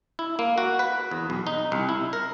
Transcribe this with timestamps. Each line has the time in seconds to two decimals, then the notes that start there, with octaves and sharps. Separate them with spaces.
0.19 E4
0.39 A#3
0.58 F#4
0.79 B4
1.11 E2
1.30 B1
1.47 D#4
1.72 C2
1.89 E4
2.13 A#4